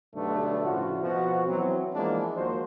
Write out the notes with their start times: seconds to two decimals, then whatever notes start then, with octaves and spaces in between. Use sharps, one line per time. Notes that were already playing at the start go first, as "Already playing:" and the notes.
0.14 B1 G2 D3 A3 B3 D4
0.65 A2 C#3 F3 F4 F#4
1.01 F2 B2 F3 F#4
1.46 E3 F#3 B3 C4
1.94 E3 F3 G#3 A#3 B3 D4
2.36 D#2 F3 A#3 F#4 C5